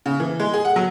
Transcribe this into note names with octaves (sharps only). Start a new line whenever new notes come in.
C#3
E3
G#3
G#4
F#5
F#3